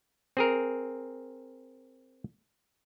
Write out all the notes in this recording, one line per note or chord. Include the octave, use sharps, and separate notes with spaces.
C4 G#4 A#4